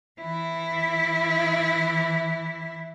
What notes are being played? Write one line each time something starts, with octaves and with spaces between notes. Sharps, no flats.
E3 E4